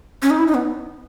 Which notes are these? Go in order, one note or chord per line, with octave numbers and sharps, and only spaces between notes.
C#4
D#4
E4
D#4
B3